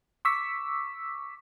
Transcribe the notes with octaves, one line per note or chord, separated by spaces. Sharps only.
C#6 D6 E6 B6